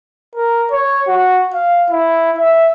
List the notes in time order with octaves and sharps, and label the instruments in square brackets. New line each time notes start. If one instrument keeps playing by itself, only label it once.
[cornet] A#4
C#5
F#4
F5
E4
E5